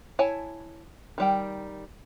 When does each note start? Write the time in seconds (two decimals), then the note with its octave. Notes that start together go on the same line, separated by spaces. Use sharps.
0.19 E4 C#5 G#5 A5
1.18 D#3 G3 G5